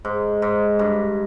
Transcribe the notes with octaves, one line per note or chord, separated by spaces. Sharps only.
G#2
G#2
G2